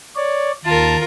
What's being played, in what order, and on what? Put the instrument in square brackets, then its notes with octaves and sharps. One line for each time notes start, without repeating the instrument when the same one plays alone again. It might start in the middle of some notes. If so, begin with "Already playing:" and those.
[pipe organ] C#5 D5
[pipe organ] D#2 A5 [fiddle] F4 A#4